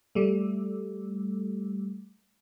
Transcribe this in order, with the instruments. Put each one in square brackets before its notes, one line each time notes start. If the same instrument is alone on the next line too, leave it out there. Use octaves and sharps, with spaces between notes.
[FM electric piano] G3 A3